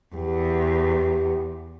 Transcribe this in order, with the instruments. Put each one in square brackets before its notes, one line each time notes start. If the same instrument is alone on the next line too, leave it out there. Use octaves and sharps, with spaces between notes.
[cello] E2 [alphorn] G4